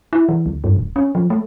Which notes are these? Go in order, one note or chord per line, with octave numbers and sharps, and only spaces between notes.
E4
E3
D2
G2
D1
C#4
F3
A3